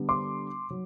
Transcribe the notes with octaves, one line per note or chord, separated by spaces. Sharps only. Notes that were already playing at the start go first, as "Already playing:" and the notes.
Already playing: D3 G3 B3 D4
C6 D6
F#3